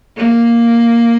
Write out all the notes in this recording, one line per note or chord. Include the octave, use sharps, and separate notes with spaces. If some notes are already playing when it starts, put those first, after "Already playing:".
A#3